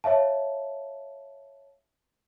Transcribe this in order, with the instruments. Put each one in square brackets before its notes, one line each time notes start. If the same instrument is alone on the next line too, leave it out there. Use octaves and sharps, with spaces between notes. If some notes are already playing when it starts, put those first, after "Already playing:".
[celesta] C#5 E5 F5 A5